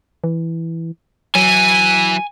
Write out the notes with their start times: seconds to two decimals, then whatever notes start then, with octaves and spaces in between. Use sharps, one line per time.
0.24 E3
1.35 E3 F#3 G#5